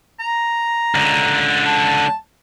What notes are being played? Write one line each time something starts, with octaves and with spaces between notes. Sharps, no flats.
A#5
C#2 D3
A5